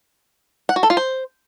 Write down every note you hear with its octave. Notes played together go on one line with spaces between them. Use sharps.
F#5
F#4
A4
F4
C5